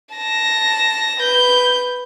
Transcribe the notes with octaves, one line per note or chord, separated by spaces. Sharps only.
A5 A#6
B4 G6